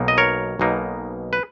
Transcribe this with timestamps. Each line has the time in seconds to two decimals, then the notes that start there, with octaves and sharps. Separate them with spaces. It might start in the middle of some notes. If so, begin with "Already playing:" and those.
Already playing: B1 B2 A#3 D#4
0.08 D#5
0.18 A#4 C#5
0.60 B1 B2 A#3 D#4
1.33 B4